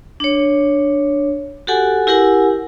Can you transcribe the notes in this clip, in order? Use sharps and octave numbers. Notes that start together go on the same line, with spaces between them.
D4 C#5
F#4 G4 A4 F#5 G#5
E4 G4 A#4 F#5 G#5